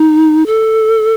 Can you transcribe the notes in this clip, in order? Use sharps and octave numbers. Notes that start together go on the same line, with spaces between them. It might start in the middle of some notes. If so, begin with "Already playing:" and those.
Already playing: D#4
A4